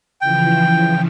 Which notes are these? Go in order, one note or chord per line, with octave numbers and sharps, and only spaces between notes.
C#3 E3 F3 G5